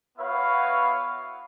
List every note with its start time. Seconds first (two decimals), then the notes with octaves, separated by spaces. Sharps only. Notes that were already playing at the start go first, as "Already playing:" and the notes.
0.18 B3 E4 F#4 B4 C#5 F5